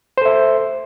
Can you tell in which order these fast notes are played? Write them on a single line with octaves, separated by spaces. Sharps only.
C5 A4 E5